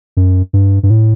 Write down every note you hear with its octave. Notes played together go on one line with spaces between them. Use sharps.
F#2
G2
G2
A2